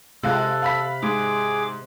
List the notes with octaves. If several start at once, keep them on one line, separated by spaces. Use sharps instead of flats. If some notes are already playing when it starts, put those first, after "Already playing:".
C3 G#3 F4 A4 F#6
F5 B5 B6
G#2 G#4 D6